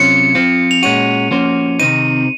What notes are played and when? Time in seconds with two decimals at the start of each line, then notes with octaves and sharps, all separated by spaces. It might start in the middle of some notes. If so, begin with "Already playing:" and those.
Already playing: C3 F#3 C#4 F4 C5 C#7
0.35 F3 C4 F4
0.71 F7
0.83 A#2 G#3 C#4 F#4 D#7
1.31 F3 A#3 C#4 F#4 C5
1.79 C3 D#3 F#3 C4 D#4 D#7